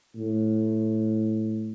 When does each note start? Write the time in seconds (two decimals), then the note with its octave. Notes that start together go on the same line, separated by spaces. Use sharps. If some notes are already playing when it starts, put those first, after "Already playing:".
0.15 A2